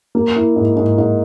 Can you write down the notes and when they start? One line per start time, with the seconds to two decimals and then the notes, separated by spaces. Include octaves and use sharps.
0.15 A#3
0.36 E4
0.56 G#2
0.76 G#2
0.98 G#2